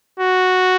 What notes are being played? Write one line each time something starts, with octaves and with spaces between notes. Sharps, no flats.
F#4